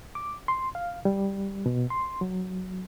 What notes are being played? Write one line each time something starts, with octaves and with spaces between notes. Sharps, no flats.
D6
C6
F5
G3
B2
C6
F#3